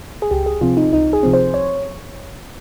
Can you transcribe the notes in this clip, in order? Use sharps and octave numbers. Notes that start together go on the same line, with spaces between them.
G#4
C#2 G4
G#4
C3 F3 C4 F4
D#4
C#2 D#4
G#4
C3 F3 C4
C5
C2 C#5